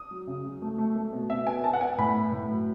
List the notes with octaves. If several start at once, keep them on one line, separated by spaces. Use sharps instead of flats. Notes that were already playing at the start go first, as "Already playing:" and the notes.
Already playing: D#6
F#3
C#3
F#3
A3
A3
A3
B2
B2 E5
B3 G#5
B3 A5
F#5
B3 G#5
A2 B5
B3
A2
F#3